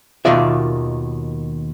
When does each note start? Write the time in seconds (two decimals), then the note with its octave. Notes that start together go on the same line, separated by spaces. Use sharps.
0.25 D#2 B2 D#3 F4 D5 E5